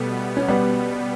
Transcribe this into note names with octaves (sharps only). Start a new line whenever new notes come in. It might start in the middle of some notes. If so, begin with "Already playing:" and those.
Already playing: B2 G3 A3 B3
C#4
G3 B3